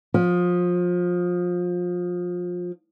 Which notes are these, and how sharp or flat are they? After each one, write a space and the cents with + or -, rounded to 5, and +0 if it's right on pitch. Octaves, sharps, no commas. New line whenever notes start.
F3 +25